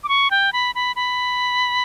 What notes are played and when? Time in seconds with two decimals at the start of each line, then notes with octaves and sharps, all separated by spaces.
0.04 D6
0.09 C#6
0.31 G5
0.53 B5
0.75 B5
0.96 B5